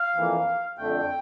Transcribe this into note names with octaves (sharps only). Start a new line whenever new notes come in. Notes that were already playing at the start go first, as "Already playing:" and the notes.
Already playing: F5
F2 E3 A#3
F2 D3 A3 G5